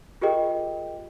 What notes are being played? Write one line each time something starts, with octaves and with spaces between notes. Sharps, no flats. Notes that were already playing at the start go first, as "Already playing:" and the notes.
F4 G4 G#4 A#4 D#5 G5